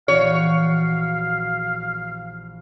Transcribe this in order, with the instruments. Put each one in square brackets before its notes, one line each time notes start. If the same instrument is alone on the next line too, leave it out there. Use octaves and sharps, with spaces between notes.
[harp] A#1 E3 F#4 [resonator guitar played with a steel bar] C#5 [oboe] F5